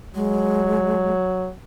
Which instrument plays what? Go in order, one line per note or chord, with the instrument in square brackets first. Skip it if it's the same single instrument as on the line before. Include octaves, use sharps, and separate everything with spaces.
[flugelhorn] F#3 [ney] G#3